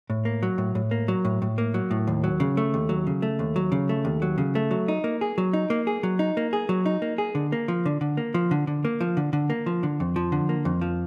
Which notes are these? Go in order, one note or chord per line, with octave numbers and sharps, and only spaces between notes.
A2
A#3
F#3
A2
A2
A#3
F#3
A2
A2
A#3
F#3
A2
D#2
F#3
C#3
A3
D#2
F#3
C#3
A3
D#2
F#3
C#3
A3
D#2
F#3
C#3
A3
F#3
D#4
A#3
G#4
F#3
D#4
A#3
G#4
F#3
D#4
A#3
G#4
F#3
D#4
A#3
G#4
D3
A#3
F3
D3
D3
A#3
F3
D3
D3
A#3
F3
D3
D3
A#3
F3
D3
F2
F3
D3
A#3
F2
F3